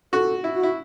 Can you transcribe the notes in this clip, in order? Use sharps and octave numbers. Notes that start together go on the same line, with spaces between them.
F#4 A4
E4
F#4
E4